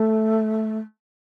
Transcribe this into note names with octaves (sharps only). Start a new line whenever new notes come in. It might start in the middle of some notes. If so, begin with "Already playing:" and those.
Already playing: A3